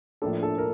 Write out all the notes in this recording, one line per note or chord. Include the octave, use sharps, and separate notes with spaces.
A#1 A2 F3 A#3 D4 A4
A4
A#4